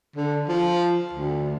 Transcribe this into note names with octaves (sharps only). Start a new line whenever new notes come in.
D3
F3
D2